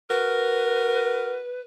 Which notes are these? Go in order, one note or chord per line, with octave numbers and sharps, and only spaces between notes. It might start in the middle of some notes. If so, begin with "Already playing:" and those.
F#4 A#4 B4